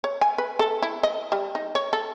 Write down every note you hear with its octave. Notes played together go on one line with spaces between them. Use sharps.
C#5
G#5
B4
A4
E4
D#5
G3
D#4
C#5
A4